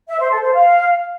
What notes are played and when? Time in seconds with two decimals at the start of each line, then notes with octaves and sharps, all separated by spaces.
0.08 E5
0.19 C5
0.31 A4
0.42 C5
0.53 F5